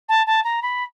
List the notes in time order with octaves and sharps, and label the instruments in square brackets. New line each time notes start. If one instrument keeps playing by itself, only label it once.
[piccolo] A5
A5
A#5
B5